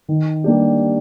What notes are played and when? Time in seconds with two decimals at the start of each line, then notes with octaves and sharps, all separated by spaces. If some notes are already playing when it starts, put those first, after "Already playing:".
0.08 D#3
0.44 G3 A#3 D4 G4